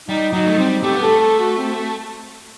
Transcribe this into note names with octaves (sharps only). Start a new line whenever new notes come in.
G3 D#4
F#3 D#4
A3
G3 C4
A3 G4
B3
A3 A4
A4
F#4
C4